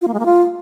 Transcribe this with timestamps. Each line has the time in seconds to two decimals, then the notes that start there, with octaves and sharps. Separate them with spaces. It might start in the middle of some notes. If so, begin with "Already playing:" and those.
0.01 F4
0.07 A#3
0.13 G#3
0.19 A#3
0.25 F4